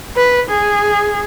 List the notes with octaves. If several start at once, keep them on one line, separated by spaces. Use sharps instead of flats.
B4
G#4